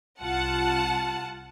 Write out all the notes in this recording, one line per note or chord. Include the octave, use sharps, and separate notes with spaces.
C2 F4 F#5 A5